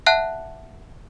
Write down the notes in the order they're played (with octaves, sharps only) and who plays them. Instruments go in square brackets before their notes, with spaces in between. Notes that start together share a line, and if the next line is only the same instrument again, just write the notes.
[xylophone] E5 F#5 A5 F#6